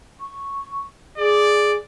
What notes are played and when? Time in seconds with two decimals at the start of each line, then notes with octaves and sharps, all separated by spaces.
0.20 C#6
1.18 G#4 D5